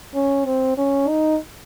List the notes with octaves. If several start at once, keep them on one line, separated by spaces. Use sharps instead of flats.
C#4
C4
C#4
D#4